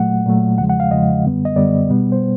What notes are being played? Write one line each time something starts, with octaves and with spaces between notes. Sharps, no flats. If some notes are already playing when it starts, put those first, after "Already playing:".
Already playing: A#2 F#3 A3 F#5
A#2 F#3 A3
E2 C#3 F3 G#3 F#5
F#5
F5
E2 C#3 F3 G#3 D#5
F#2 D3 G3 B3
D#5
F#2 D3 G3 B3 D5
B2 G3 B3
C5